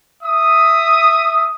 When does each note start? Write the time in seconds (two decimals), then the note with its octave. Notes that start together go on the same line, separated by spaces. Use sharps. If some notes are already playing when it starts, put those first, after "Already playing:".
0.22 E5 D#6